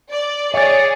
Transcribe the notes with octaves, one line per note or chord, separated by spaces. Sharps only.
D5
G#4 C#5 D5